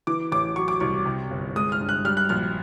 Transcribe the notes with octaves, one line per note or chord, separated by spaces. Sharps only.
E3 D6
A1 D6
F#3 C#6
D6
C2 C#6
C3
G1
G#3 D#6
F6
G2
F#6
G3 F6
F#6
A#1 F6